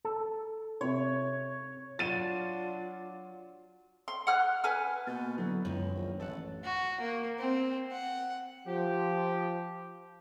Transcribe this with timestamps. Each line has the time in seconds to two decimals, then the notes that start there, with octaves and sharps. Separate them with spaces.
0.05 A4
0.81 C3 C#5
1.99 F#3 D4 F4 A6 D#7 E7
4.08 C6
4.27 F#5 F6 F#6
4.64 B4 G#5 F6
5.07 B2 A#3 G6 A6
5.38 D3 F#3 B3 E4
5.65 C#2 F#2 D#3 C#5
5.95 A#1
6.20 A1 A4 F#5
6.64 F#4
7.00 A#3
7.39 C4
7.92 F#5
8.67 F3 G4